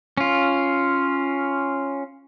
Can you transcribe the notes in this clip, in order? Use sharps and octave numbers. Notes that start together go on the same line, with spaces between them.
C#4 F4